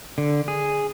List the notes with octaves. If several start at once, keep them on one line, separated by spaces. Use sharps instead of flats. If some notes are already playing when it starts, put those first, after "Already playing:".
D3
G#4